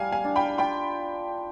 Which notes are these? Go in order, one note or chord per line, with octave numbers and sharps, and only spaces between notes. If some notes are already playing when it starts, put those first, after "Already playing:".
Already playing: G3 F5 G#5
F5 G#5
D4
G5 B5
F4 G5 B5